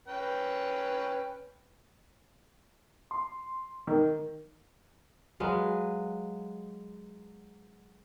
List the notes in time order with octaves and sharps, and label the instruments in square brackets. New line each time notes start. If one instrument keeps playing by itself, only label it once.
[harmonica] C#4 B4 G5
[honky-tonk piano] C6
D#3
[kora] F#3 G#3 B4 F5